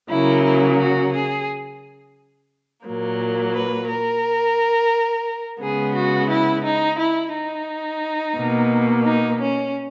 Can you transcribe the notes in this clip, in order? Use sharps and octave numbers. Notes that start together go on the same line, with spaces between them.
C#3 F#3 A#3 E4
E4
F#4
G#4
A#2 F#3 A#3
B4
A#4
C#3 G#3 B3 G#4
F#4
E4
D#4
E4
D#4
B2 A#3
D#4
C#4